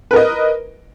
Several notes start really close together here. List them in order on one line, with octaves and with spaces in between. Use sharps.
B4 A#4 D#5